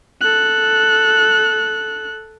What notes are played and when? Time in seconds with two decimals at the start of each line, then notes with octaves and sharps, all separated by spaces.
0.21 A4 F#6